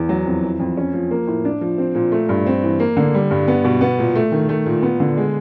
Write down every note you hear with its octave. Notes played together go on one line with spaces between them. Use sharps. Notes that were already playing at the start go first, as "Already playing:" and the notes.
Already playing: E2
F#3
F2
E3
F2
C#4
F3
A#3
A2
D4
F3
C4
A#2
A3
G2
C4
E3
A#3
D3
G3
G2
B3
B2
B3
A#2
A3
D#3
A3
A#2
B3
D3
G#3